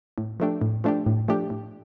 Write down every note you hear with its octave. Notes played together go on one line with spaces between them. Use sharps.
A2
F3 A3 D4 G4
A2
F3 A3 D4 G4
A2
F3 A3 D4 G4
A2